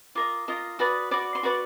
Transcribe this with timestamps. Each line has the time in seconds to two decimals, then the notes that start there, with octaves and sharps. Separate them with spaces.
0.15 F4 A#4 D#5 D6
0.48 F4 A#4 D#5
0.79 F#4 B4 D5 D#6
1.11 F#4 B4 D5 D6
1.35 C6
1.43 F#4 B4 D5 C#6